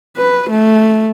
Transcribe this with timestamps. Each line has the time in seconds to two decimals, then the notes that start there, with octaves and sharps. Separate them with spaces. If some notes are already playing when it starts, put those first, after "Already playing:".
0.17 B4
0.50 A3